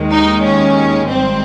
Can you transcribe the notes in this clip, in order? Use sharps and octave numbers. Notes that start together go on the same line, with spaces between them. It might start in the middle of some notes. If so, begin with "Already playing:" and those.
Already playing: D#2 D#3 G#3
D#4
C#4
G#1 G#2 G3 C4